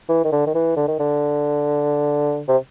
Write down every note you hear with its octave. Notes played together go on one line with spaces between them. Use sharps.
E3
D#3
D3
D#3
E3
D3
D#3
D3
C3